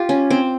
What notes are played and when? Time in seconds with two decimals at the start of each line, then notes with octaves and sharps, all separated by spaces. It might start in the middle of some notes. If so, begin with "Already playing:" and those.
Already playing: F4 G4
0.09 C#4
0.31 C4